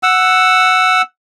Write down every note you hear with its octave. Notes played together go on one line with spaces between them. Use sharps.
F#5 E6